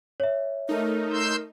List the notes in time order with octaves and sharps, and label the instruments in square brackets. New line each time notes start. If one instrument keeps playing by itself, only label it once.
[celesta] C#5 E5
[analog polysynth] A3 D#4 [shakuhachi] A#4
[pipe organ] C6 E6 G6